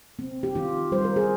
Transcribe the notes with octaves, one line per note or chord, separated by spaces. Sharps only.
C4
G4
D#3 F4
G3 C5
A#4
G#4